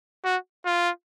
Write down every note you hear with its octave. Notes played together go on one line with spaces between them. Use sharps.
F#4
F4